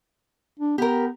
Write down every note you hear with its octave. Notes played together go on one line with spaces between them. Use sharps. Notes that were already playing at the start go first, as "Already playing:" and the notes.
D4
B3 G4 A#4